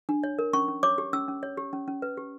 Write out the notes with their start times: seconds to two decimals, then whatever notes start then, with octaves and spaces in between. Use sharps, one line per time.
0.09 D4
0.23 C#5
0.39 A#4
0.53 C#4 C#6
0.68 C#4
0.83 C#5 D6
0.98 G4
1.13 C#4 E6
1.28 C#4
1.43 C#5
1.57 G4
1.73 C#4
1.88 C#4
2.02 B4
2.17 G4